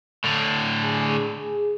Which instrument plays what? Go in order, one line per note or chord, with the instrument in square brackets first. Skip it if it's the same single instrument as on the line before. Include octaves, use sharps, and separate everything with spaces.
[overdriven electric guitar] A2 D3 [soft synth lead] A5
[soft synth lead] G#4